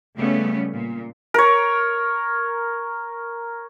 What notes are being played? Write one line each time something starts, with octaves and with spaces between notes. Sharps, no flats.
C#3 G3 A3 B3 C#4
A#2
A#4 C#5